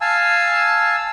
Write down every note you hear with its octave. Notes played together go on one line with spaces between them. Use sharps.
F5 G#5 A5 E6